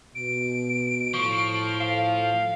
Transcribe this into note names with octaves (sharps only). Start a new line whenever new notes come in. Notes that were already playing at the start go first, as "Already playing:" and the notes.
B2 D7
A2 F3 C#6
F5